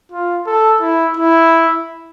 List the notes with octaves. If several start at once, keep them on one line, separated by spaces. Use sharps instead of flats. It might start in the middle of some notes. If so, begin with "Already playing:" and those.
F4
A4
E4
E4